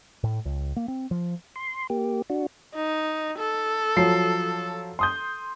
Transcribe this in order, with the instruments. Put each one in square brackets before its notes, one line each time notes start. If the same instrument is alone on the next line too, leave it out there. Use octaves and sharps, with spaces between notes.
[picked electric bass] A2
C#2
A#3
C4
F3
[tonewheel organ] C6
A#3 G4
D4 F#4
[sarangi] D#4
A4
[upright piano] F3 F#3 C7
C6 D#6 G6